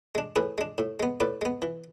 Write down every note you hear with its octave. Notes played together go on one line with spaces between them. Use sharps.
G#3 D4
A2 G#4 B4
G#3 D4
A2
G#3 B3
A2 B4 D5
G#3 B3
E3